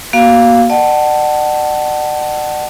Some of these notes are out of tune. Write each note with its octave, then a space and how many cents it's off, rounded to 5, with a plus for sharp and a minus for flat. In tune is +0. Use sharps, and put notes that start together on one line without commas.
A#3 +35 F#4 +20 F5 +0
D5 +45 F#5 +30 A5 +0